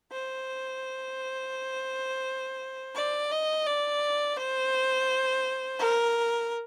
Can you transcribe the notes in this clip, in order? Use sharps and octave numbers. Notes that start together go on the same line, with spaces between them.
C5
D5
D#5
D5
C5
A#4